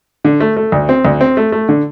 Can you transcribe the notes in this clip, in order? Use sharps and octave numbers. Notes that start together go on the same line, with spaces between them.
D3
A3
A3
D2
C4
D2
C4
A3
A3
D3